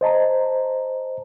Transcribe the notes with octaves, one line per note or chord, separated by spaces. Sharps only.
C5 D#5 A5 A#5